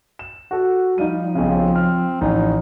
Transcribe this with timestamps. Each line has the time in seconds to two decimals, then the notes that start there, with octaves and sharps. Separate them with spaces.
0.19 E7
0.51 F#4 A4
0.98 F3 G3 D#4 F5 D#7
1.35 B1 C#3 C4
1.75 F6
2.21 A1 D#4